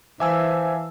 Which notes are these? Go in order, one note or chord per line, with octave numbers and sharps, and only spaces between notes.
E3 C5 E5 F5 G#5 A5 D6 E6